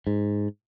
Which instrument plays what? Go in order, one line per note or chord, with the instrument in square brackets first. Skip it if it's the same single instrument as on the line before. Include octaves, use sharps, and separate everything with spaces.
[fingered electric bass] G#2